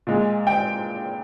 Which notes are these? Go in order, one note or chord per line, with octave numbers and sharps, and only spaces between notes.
A#2 G#3
G5